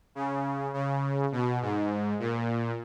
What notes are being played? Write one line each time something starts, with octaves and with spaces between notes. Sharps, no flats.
C#3
C#3
B2
G#2
A#2